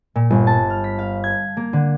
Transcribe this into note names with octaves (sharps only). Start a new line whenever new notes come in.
A#2
G1
A5
F6
B6
F5
G#6
A#3
D3